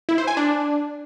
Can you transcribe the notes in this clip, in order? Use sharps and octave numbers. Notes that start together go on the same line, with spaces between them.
E4
C5
G#5
D4